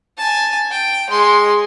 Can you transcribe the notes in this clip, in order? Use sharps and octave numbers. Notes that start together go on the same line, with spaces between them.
G#5 A5
G5
G#3 C6